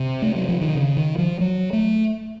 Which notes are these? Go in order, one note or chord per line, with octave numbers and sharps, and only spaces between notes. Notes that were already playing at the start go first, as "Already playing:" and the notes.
Already playing: C3
A3
F#3
F3
D#3
C#3
D#3
F3
F#3
A3